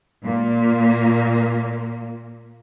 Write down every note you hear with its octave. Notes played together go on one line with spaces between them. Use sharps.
A#2 A#3